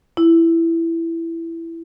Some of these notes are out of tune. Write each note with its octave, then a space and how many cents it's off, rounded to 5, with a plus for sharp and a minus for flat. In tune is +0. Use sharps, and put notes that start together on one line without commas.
E4 +10